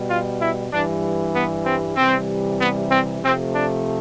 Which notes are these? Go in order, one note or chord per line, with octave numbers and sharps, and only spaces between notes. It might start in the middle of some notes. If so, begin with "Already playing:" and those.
Already playing: B2 G3
F4
E4
G2 E3 G3 D4
B3
C4
C3 E3 G3 C4
B3
C4
C3 F3 A3 C4
D4